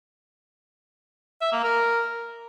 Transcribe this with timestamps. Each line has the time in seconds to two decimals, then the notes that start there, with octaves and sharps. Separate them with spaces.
1.41 E5
1.52 A#3
1.64 A#4